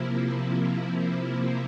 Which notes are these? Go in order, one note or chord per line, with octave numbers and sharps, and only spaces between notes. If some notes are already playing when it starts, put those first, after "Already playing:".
Already playing: C3 F3 A#3 E4